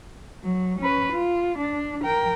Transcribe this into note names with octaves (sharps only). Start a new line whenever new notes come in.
F#3
C#4 B4
F4
D4
A#4 G5